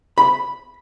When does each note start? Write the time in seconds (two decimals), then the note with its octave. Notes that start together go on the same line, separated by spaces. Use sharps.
0.18 B5